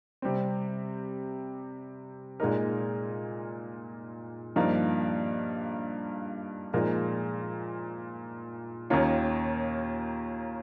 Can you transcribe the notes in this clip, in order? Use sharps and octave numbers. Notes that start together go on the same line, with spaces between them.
C3 G3 C4
A#2 G#3 D#4 A#4
G2 F3 A#3 D#4
A#2 F3 G#3 D#4 A#4
D#2 D#3 A#3 C#4 F4